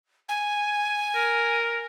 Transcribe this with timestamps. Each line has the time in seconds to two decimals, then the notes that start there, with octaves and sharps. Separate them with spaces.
0.28 G#5
1.15 A#4